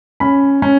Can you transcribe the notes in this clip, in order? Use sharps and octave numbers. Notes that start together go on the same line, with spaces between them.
C#4 B5
C#4